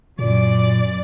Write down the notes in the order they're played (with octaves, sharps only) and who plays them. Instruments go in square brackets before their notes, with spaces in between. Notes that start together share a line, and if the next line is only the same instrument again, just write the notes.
[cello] F#2 D5 [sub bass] A#2